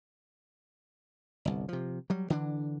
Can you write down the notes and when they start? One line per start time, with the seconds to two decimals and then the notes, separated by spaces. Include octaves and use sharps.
1.45 G1 C2
1.69 C3 F3
2.10 F#3 G3
2.30 D3 E3 D4